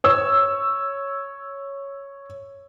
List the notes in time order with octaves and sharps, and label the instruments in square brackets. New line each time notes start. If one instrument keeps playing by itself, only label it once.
[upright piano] C#5 E6